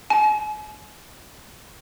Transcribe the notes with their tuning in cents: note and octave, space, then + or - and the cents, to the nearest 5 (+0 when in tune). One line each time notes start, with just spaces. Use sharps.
G#5 +40